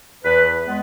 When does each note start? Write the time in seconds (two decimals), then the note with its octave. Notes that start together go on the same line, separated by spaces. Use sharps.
0.23 E2 B4
0.65 G#3 B3